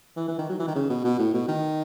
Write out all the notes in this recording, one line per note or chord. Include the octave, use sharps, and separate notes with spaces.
E3
E3
D#3
F#3
E3
D#3
C#3
B2
B2
A2
B2
D#3